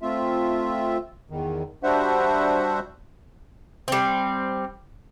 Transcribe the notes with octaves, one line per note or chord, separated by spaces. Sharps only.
A3 C4 F4 E5
E2 D#3
G3 D4 F#4 C5 E5 F#5
G3 C4